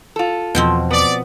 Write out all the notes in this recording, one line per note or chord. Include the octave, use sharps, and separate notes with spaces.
F4 A4
E2 B2 F3 C4
B3 D5